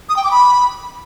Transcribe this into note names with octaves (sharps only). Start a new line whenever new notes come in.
D#6
G5
D6
B5